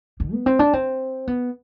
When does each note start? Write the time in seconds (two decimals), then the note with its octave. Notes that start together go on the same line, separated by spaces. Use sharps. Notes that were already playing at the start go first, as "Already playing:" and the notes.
0.20 D3
0.33 B3
0.46 C4
0.59 D4
0.73 C4
1.27 B3